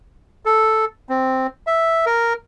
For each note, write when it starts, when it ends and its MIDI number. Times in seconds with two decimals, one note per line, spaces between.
0.45 0.85 69
1.09 1.47 60
1.67 2.05 76
2.06 2.33 70